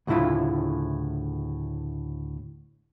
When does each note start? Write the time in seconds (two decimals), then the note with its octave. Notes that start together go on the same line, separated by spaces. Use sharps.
0.07 D2 A2 C#3 E4 F4